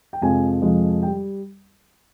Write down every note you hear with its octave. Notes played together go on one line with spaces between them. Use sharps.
G5
F2 C3 F3 G#3 G#5
F2 C3 F3 G#3
G5
G3